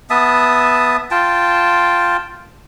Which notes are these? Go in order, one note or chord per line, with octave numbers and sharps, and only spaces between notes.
B3 E5 A5 D#6
F4 G5 A5